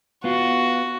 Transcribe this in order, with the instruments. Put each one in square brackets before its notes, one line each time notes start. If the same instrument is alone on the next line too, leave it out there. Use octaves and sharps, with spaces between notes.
[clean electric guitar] B3 F4 [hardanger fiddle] F#4